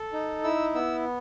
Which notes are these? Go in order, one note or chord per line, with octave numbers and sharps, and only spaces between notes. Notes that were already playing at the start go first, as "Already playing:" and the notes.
Already playing: A4
D#4
E4 E6
B3 E6